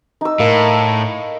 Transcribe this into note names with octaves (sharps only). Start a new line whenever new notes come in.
D#4 E6
A2 A#3